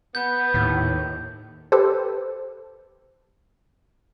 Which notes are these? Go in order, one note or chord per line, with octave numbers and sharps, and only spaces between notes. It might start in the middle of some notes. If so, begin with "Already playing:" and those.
B3 G6
D#2 A2
G4 A4 B4 C5